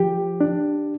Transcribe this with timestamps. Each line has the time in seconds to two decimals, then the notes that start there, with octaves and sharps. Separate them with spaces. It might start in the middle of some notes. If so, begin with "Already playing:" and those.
Already playing: F3 G4
0.41 D4